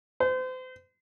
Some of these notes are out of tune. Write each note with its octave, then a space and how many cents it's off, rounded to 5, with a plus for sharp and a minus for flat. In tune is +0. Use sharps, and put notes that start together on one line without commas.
C5 -35